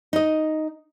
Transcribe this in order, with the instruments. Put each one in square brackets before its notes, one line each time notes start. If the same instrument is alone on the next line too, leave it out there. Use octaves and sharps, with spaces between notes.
[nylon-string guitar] D#4 D#5